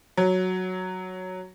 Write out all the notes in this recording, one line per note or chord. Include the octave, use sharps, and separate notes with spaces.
F#3